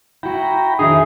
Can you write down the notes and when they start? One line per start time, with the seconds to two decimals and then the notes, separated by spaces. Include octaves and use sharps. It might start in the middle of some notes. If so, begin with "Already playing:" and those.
0.23 E4 F#4 G5 A#5 B5
0.79 F2 D#3 D4 D#4 G#4 E5